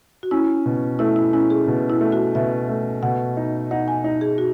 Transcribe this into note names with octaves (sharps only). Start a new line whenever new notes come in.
F#4
C#4 E4
B2
A3 E4
E4
C#4 E4
G#4
B2
E4
A3
F#4
B2 E5
A3
B2 F#5
D#4
D#4 F#5
G#5
D#4
G#4
F#4